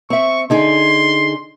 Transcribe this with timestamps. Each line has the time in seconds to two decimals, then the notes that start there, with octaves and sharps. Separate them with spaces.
0.10 C4 E5 C#6
0.50 D3 D#4 G#4 C6